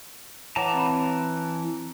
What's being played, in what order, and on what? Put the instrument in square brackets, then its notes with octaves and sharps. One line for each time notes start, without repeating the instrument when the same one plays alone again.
[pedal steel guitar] E3 A5 A#5 [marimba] C#5 F#5 D6
[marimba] C4 B5